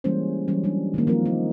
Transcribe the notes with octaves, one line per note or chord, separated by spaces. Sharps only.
E3 G3 G#3 A#3 C#4 C5
E3 F#3 G3 C#4
G3 G#3 D4
D#3 G#3 A#3
F3 A#3 C4 A#4
D#4